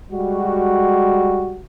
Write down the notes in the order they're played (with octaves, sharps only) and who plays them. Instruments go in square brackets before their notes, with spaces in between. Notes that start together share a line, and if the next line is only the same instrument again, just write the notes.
[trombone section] G3 G#3 F#4